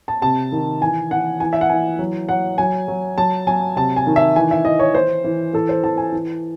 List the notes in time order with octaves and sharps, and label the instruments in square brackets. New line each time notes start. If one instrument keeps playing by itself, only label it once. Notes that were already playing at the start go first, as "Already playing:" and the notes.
[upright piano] A5
C3 A5
D#3
E3 G#5
E3 F#5
E3 G#5
E5
F#5
E3 G#5
F#3
F#3 F#5
F#3 G#5
F#3
F#3 A5
F#3 G#5
C3 A5
G#5
D#3
E5
E3 G#5
E5
E3 D#5
C#5
E3 C5
E3
E3 A4
C5
E3 A5
G#5
E3